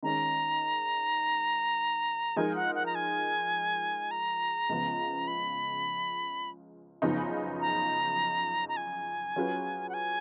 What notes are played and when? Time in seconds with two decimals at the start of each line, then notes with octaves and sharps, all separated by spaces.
0.03 D#3 G#3 C#4 A#5
2.36 F3 G#3 D#4 A#4 G#5
2.55 F#5
2.75 F#5
2.86 A#5
2.95 G#5
4.11 A#5
4.69 C#2 C#3 F3 B3
5.27 B5
7.02 F#2 C#3 F3 B3 D#4
7.61 A#5
8.69 A#5
8.77 G#5
9.36 F#3 C#4 F4 G#4 B4
9.89 F#5
9.94 G#5